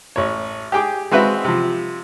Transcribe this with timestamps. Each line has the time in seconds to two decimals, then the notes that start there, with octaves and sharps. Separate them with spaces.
0.16 A1 C#5
0.72 G4 G#4 G5 D6
1.12 G#3 C4 F#4 B4 E5 F5
1.45 C3 F3